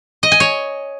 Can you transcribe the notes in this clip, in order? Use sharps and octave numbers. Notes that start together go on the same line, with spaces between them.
D#5
G#5
C#5